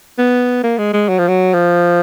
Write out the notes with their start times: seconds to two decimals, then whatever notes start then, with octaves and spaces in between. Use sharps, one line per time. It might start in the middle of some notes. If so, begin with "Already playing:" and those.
0.18 B3
0.63 A#3
0.78 G#3
0.93 G#3
1.09 F#3
1.19 F3
1.28 F#3
1.54 F3